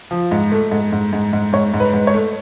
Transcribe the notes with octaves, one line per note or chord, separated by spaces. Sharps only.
F3
G#2
A3
G#2
G#2
G#2
G#2
G#2 C#5
G#2
B4
G#2
C#5
A3